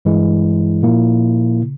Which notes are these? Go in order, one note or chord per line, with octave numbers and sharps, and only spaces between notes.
G2 E3 G#3 E4
A#2 F3 A#3 E4
C#3